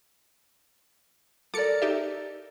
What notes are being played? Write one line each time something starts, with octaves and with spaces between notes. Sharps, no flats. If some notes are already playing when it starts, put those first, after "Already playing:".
A4 A#4 D5 D6 C#7
D#4 G4 E5